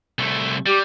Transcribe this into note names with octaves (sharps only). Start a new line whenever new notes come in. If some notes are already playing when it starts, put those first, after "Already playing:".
C2 A3
G3 G4